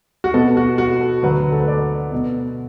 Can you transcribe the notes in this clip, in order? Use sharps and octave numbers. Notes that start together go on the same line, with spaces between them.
F#4
B2 B3 A4
F#4
F#4
A4
D2 D3 F#3 A3 B4
A4
B4
D5
B2 B3